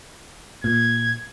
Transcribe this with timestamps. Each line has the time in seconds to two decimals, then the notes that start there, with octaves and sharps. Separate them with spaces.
0.64 A#2 G#6